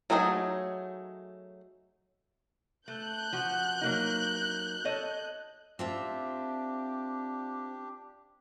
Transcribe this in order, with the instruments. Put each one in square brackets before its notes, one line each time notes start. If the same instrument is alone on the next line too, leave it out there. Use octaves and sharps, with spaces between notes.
[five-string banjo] F#3 A3 D#4 F#4 G#4
[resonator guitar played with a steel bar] A3 [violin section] F#6 G6
[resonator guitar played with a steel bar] F3 F#4
F#3 A#3 D#4
A4 C#5 D#5
[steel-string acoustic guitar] C4 F4 E5 [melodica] D4 G4